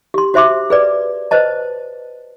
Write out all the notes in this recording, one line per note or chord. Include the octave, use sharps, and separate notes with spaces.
G4 C6
F#4 C5 E5 C6 D6
G#4 B4 D5
B4 C5 D#5 A5